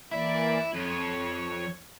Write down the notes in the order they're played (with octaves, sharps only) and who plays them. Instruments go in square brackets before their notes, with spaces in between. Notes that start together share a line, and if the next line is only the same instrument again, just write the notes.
[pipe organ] E3 A#3 D5 [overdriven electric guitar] E4
[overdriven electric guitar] F2 [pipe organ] C#5